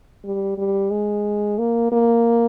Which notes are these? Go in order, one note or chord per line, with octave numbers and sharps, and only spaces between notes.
G3
G3
G#3
A#3
A#3